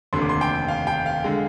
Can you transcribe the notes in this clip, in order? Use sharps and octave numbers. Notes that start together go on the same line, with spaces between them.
F1 D#2 D3 C6
D6
C6
G5
F5
G5
F5
D3 G#3